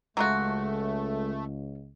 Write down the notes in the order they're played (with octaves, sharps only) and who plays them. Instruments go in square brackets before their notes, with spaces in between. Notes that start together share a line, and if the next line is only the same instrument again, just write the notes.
[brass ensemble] C#2 [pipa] F#3 F4 F#4 [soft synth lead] G#3 [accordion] A3